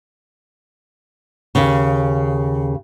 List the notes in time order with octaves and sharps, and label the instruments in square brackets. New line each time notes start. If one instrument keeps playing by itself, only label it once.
[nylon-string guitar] D#2 C#3